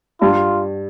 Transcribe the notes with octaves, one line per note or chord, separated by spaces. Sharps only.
G2 F4